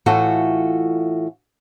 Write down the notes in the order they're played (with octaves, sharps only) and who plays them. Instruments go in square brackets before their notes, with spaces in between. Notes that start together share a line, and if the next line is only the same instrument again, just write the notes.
[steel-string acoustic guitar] A2 E3 F4 F#4 A4